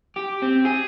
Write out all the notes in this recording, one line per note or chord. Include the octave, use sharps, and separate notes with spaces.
G4
C4
G#4